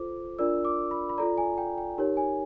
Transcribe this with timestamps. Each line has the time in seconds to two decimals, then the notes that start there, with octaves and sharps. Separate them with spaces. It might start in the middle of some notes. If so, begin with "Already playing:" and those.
Already playing: F4 A4 C5 D6
0.39 D4 F4 A#4 D5 E6
0.65 D6
0.91 B5
1.09 B5
1.18 F4 A4 D5 A#5
1.38 G#5
1.58 G5
1.78 G5
1.98 D#4 G4 A#4 C#5
2.17 G#5